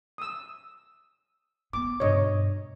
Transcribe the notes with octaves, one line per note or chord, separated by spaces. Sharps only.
D#6 E6
B3 D6
G2 B2 C#5 D#5